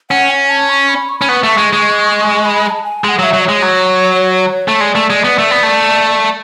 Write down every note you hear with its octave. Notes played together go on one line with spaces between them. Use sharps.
C#4 F#5
G#5
A5
C#6
B5
C#6
C#4 B5
B3 C#6
A3
G#3
G#3
B5
B5
A5
G#5
G#3 F#5 G#5
F#3 E5
F#3
C#5
G#3
F#3
A3
G#3 D5
A3
G#3
B3
A3
B3
A3